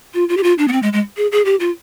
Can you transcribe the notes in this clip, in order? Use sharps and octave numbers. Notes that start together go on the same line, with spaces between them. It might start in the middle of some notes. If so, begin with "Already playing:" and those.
F4
F4
G4
F4
D4
B3
C4
G#3
G#3
G#4
G#4
G4
F4